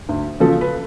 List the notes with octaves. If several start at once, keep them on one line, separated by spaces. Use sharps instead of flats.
D2
C#3 F3 A4
B4